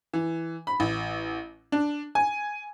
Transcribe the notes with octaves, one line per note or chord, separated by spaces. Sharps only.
E3
B5
A1
D4
G#5